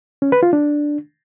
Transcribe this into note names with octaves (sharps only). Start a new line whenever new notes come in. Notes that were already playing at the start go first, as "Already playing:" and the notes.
C#4
B4
F4
D4